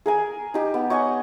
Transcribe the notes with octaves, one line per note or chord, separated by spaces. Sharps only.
G#4 A#4 G#5
D#4 G4
B3
C#5 D#5 F#5 G#5